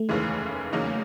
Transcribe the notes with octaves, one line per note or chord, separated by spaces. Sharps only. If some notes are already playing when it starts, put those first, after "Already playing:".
Already playing: A3
F1 D#2 C#3 E3 G#3
E2 C#3 F#3 A#3 D#4